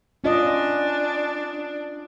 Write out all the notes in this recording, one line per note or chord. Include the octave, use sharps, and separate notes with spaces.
C#4 D4 F4 D#5